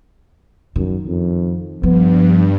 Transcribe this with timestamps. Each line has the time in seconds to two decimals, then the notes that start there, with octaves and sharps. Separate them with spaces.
0.76 F#2 D#3
1.05 F2
1.83 G2 F3 B3